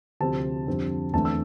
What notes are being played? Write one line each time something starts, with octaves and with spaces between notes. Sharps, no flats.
D2 C3 F3 C4 A5
F2 D3 G3 C4
E2 D3 A3 C4 A5
E6